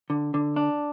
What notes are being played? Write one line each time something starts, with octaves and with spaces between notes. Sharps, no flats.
D3
D3
D4